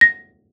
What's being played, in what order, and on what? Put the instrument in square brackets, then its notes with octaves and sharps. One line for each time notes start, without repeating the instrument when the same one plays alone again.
[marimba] A#6